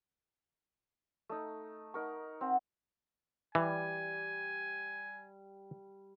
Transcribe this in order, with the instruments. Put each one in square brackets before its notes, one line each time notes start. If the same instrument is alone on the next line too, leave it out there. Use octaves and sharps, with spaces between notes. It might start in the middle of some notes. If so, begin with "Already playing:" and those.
[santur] A3 D#4
D#4 A#4 C#6
C4 F#5
[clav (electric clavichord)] E3 [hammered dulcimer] G3 [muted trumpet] G#5